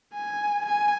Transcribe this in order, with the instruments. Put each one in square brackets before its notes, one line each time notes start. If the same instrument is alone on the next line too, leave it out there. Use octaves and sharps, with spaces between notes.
[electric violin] G#5
G#5